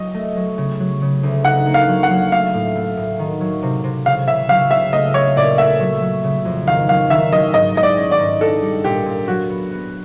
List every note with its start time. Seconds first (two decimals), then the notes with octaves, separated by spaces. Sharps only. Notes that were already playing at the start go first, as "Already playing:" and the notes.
Already playing: F#3 D#5
0.14 A3
0.37 F#3
0.58 C#3
0.80 F#3
1.02 C#3
1.23 D2
1.45 D#4 F#5
1.67 A#3
1.74 F5
1.89 F#3
2.03 F#5
2.11 F#3
2.32 A3 F5
2.54 A2
2.76 A3
2.97 A2
3.19 D#3
3.41 F#3
3.62 C3
3.84 C3
4.06 C#3 F5
4.28 C#3 E5
4.49 F#3 F5
4.71 C#3 E5
4.92 A3 D#5
5.14 A3 C#5
5.36 A#2 D5
5.58 A3 E5
5.80 F#3
6.02 F#3
6.24 C#3
6.45 F2
6.67 D#3 F5
6.88 F#3 F5
7.10 D#3 E5
7.32 F#3 D#5
7.54 G#2 D#5
7.75 G#3 D#5
7.83 D5
7.98 C#4
8.11 D5
8.19 G#2
8.41 D4 A4
8.62 G3
8.85 A#2 G4
9.06 A#2
9.28 F#3 F#4
9.50 B3
9.72 B3